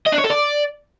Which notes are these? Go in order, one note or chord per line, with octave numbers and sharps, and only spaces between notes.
D#5
D4
C#5
A4
D5